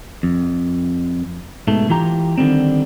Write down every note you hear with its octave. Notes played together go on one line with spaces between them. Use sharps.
F2
G#2 B2 A3
E3 F4 G4 A#5
D3 D#3 G3 C4